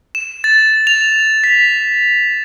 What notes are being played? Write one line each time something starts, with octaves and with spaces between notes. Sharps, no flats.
E7
A6
F7
B6